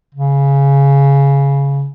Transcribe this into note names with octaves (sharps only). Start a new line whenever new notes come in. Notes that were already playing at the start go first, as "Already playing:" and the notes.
C#3